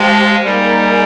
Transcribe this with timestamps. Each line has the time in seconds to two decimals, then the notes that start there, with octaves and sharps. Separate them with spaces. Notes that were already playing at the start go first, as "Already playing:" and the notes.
Already playing: G#3 G4 C5 F5 A5
0.45 G3 A#3 D#4 G#4